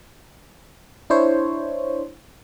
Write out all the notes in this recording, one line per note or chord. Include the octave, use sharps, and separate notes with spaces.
D4 E4 C5 C#5